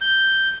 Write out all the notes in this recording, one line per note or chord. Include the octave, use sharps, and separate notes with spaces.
G6